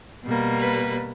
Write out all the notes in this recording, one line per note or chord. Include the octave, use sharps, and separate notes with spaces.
B2 G3 A#3
B4